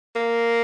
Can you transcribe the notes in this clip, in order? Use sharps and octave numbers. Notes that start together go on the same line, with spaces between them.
A#3